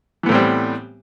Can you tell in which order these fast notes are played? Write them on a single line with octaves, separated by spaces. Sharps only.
E3 B3 A2 C4 G3